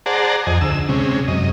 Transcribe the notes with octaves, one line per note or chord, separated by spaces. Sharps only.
G#4 C5 D5 F#5 A5 A#5
F2 D#5 G#5
D2 E6
C3 G#3 C#4
F#2 D#5